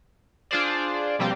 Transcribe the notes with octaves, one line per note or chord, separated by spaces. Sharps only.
D4 F4 G#4 C5 D5
B2 F3 G3 A#3 C4 G4